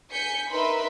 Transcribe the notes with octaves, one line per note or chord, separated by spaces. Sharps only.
G#5 G6 B6 C#7
D#4 A#4 B4 E5 B5 C6